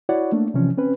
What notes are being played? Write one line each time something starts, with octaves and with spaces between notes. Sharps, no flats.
E4 F#4 C#5 D5 F#5
A3 A#3 D4
C3 E3 F3 C#4
C4 C#4 B4